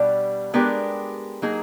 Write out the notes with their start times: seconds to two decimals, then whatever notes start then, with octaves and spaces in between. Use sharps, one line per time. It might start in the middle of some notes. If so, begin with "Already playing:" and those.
Already playing: B2 G3 D4
0.53 G#3 B3 D4 G4 A#4
1.42 F#3 A#3 D#4 G#4